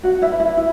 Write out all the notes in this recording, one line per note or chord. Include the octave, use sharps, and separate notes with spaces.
C#4 F#4 F#5
E4 E5
B4
E4 E5
E4